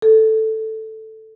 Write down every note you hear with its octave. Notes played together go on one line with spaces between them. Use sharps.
A4